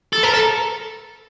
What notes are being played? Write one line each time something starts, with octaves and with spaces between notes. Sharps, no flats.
A4
A#4
A4